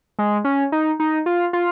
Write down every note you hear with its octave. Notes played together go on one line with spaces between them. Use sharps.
G#3
C#4
D#4
D#4
F4
F4